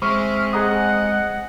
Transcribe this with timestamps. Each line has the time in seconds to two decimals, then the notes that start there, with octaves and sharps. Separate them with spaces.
0.02 G#3 C4 E5 C#6 F6
0.53 G#4 D#5 F#5 A#5 D#6